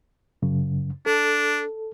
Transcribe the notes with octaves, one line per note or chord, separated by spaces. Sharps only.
F#2 C#3
D4 A4